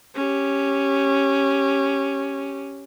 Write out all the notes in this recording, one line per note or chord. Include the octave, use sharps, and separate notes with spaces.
C#4 G4